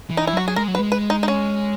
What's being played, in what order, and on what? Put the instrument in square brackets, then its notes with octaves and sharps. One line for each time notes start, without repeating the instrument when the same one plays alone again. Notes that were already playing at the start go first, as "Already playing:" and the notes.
[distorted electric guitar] E3
[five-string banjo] D#4
E4
[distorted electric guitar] F#3 [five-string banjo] F#4
[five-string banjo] G#4
[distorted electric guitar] G#3 [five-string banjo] A#4
[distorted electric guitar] F#3
[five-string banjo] B4
[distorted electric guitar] G#3
[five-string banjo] B4
D#4
D#4
C#4